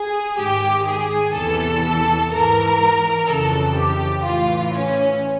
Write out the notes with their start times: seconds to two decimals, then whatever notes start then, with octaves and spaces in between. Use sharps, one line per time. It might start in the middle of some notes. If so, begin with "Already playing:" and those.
Already playing: G#4
0.37 G#2 D#3 G4
0.86 G#4
1.33 E2 C3 E3 A4
2.30 G#2 E3 A#4
3.27 F2 C#3 E3 A4
3.75 G4
4.24 A2 E3 F4
4.72 C#4